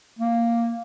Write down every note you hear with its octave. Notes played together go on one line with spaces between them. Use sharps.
A#3